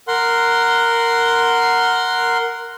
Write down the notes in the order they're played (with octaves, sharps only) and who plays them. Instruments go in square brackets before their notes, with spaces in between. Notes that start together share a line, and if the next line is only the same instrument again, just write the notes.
[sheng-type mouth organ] A#4 F#5 C6